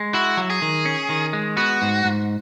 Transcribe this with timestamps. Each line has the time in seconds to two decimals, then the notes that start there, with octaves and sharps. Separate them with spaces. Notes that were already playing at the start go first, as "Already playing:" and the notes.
Already playing: G#3
0.14 E4 F#4
0.37 F#3
0.50 G#4
0.62 D#3
0.85 C#4
1.10 D#3
1.33 G#3
1.57 B3 F#4
1.82 G#2
2.05 G#2